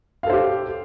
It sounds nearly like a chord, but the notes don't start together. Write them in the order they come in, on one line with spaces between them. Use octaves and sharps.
F5 A4 C5 G4